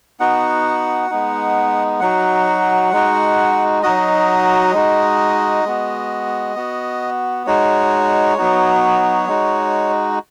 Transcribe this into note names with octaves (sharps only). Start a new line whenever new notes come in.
B3 D#4 F#4 F#5
G#3 B3 D#4
F#3 D#4 F#4 F#5
G#3 D#4 F#4
F#3 D#4 F#4 D#5
G#3 D#4 F#4
G#3 B3 F#4
B3 F#4
G#3 D#4 F#4 C#5
F#3 B3 D#4 F#4
G#3 D#4 F#4